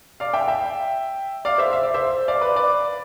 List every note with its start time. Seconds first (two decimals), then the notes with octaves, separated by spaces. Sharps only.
0.20 D5 F5
0.34 E5 G5
0.48 E5 G5
1.45 D5 F5
1.58 C5 E5
1.73 E5
1.83 D5
1.94 C5 E5
2.28 D5 F5
2.41 B4 D5
2.56 B4 D5